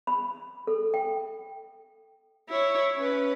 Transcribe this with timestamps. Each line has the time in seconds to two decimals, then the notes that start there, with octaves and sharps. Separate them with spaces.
0.07 B5
0.67 A4
0.94 G5
2.49 E4 C#5
2.97 C#4 B4